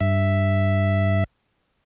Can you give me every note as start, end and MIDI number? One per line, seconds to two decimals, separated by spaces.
0.01 1.24 43
0.01 1.24 76